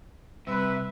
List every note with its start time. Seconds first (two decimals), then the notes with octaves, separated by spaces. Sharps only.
0.47 C3 G3 C4 B4 E5